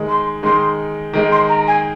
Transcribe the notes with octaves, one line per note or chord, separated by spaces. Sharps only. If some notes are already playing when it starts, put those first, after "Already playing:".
Already playing: D#3 G#3 D#4
C6
D#3 G#3 D#4 C6
D#3 G#3 D#4
C6
A#5
G#5